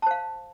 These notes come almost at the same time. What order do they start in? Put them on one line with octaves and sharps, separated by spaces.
A5 C5 F5